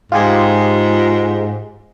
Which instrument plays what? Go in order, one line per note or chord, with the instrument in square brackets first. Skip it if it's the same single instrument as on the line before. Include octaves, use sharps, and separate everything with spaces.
[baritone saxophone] G#2 [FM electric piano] F4 G4 G#4